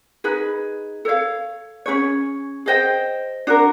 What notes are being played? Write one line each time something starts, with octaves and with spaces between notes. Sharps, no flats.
D#4 G#4 B4
A4 C#5 F5
C#4 E4 G#4 C#5
G#4 C5 D#5 G5
D4 F#4 A#4